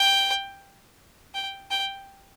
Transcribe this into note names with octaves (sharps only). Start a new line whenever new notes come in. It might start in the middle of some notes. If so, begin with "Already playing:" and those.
Already playing: G5
G5
G5